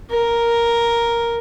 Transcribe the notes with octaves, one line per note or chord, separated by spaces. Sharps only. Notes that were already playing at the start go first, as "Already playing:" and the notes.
A#4